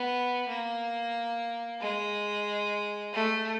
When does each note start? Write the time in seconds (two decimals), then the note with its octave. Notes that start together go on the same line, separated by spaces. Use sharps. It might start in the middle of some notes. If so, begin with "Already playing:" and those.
Already playing: B3
0.48 A#3
1.81 G#3
3.13 A3